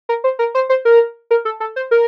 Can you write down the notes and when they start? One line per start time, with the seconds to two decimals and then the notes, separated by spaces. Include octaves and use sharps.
0.09 A#4
0.24 C5
0.39 A#4
0.55 C5
0.69 C5
0.85 A#4
1.31 A#4
1.45 A4
1.60 A4
1.76 C5
1.91 A#4